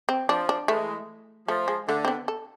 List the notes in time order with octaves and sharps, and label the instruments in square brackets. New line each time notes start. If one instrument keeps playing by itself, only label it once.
[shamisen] C4
[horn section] F3 [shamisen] D4
[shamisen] D4
[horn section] E3 G#3 [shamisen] A3
[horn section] F3 [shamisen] A3
[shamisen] G#3
[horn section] D3 [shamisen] A3
[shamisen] C4
B3
A4